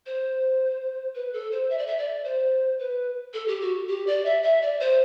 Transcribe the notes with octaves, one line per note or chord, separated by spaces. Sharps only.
C5
B4
A4
C5
E5
D5
E5
D5
C5
B4
A4
G4
F#4
G4
D5
E5
E5
D5
C5